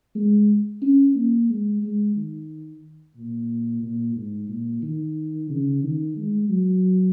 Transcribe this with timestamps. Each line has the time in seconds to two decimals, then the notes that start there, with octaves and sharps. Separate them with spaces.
0.15 G#3
0.82 C#4
1.15 A#3
1.50 G#3
1.82 G#3
2.16 D#3
3.17 A#2
3.82 A#2
4.16 G#2
4.49 A#2
4.82 D#3
5.50 C#3
5.83 D#3
6.17 G#3
6.49 F#3